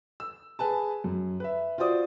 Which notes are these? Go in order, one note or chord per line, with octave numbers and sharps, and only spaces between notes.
E6
G#4 B4 G#5 A5
F#2
B4 E5
F4 F#4 C5 D5 D#6